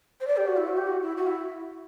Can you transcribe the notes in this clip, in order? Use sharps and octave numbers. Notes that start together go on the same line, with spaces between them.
C5
D5
G4
F#4
E4
F#4
G4
F#4
E4
F#4
E4